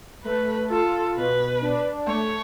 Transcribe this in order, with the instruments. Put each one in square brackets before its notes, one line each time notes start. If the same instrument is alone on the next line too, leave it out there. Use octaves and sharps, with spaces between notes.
[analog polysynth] A3 [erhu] B4
[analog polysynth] F4 [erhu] A4
[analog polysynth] B2 [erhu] B4
[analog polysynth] D4
[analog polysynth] A3 [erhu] C#5